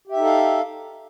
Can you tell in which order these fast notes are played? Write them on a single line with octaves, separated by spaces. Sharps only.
G4 E5 D#4 A4 F5